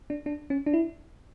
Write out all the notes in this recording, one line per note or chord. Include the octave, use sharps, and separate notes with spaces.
D4
D4
C#4
D4
E4